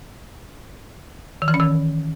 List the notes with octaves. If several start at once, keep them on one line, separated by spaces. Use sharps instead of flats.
D#3
E3
C#4
D#3